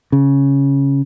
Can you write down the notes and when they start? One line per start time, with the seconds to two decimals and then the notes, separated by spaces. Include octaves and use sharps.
0.12 C#3